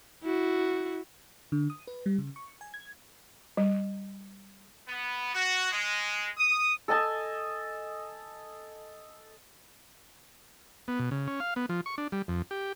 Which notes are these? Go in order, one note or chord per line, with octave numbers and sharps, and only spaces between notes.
E4 F#4
D3
D#6
B4
G3
C#3
C#6
G#5
G#6
G3
B3
F#4
G#3
D#6
A4 D#5 G#5 A5
B3
B2
C#3
C#4
F5
B3
F3
C#6
D4
G3
F2
G4